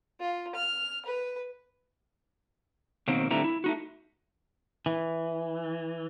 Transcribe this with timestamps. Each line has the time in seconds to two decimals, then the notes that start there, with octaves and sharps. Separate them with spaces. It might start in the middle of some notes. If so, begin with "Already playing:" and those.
0.20 F4
0.55 F6
1.05 B4
3.08 B2 D#3 F#3 A#3 C4
3.30 A2 D3 G3 C4 E4 A#5
3.44 E4
3.64 A3 D#4 F#4
4.86 E3